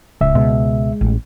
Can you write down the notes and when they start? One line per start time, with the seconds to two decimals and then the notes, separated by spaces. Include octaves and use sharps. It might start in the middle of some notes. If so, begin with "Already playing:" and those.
0.21 D1 C#2 E5
0.35 B2 G#3
1.01 A1